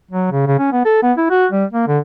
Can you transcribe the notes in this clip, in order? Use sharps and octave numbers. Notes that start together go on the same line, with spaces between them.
F#3
C#3
C#3
C#4
B3
A4
B3
E4
F#4
G3
A#3
D3